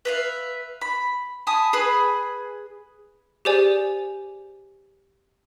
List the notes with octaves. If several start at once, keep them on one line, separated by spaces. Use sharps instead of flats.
B4 E5 F5
B5
G#5 A5 B5 D#6
G#4 B4 B5
G4 G#4 C5 D5 G#5